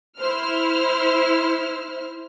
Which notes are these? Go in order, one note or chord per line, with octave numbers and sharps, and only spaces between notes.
E4 C5 F6